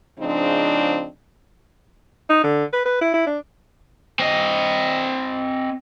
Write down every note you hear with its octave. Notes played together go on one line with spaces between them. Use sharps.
C#3 F3 G#3 C4 D4 D#4
D#4
D3
B4
B4
E4
E4
D4
C4 D#5